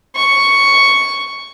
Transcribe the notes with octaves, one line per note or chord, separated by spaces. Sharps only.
C#6